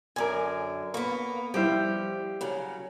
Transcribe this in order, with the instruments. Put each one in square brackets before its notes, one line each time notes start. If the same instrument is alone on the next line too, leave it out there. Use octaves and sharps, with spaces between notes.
[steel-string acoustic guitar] F#2 D3 [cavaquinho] A#4 G#5
[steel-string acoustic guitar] A#3 B3 [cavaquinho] C#6
[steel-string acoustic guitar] F3 [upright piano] G3 E4 [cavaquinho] G4 C5
[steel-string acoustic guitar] C#3 F#3